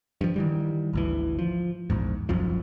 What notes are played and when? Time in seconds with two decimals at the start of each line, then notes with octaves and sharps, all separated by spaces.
0.21 G2 F3
0.36 D#3 E3 G3
0.93 G#1 D2 E3
1.39 F3
1.90 A#1 E2 G#2
2.29 E1 B1 F#2 F3